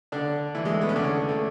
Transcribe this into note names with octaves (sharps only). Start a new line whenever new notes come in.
D3 D4
E3 E4
G#3
A3
B3
C#4
D3 D4
A3